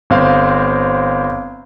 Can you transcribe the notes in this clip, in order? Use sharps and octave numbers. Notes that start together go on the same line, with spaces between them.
G1 C4 F5